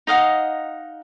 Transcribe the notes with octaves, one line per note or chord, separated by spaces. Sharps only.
D#4 D#5 F5 F#5